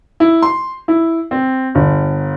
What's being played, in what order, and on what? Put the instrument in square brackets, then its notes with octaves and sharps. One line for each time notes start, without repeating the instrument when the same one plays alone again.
[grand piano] E4
C6
E4
C4
G1